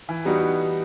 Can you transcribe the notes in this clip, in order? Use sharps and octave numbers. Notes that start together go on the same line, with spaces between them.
E3
G3 B3 D#4 F#4